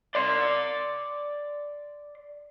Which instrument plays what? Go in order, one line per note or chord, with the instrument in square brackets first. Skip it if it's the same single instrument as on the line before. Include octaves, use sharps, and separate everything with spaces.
[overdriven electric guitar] D5 C6